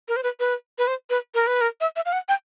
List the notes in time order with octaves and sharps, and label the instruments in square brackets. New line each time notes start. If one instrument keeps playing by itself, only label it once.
[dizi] A#4
C5
B4
B4
B4
C5
B4
A#4
B4
A#4
E5
E5
F5
F#5
G5